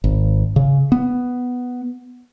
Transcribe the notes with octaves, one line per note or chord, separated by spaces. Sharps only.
G#1
C#3
B3